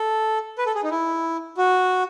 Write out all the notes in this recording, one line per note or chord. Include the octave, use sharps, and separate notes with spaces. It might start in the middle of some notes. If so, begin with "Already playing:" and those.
Already playing: A4
B4
A4
G#4
D#4
E4
F#4